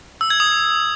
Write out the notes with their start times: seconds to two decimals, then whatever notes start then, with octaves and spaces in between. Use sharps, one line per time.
0.21 E6
0.30 G#6
0.40 D#6